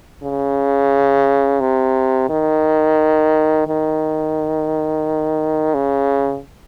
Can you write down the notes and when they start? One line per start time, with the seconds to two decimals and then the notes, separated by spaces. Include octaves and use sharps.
0.23 C#3
1.60 C3
2.29 D#3
3.67 D#3
5.74 C#3